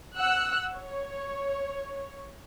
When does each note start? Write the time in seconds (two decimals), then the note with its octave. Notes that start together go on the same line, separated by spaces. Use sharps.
0.18 F#5 E6 F#6
0.75 C#5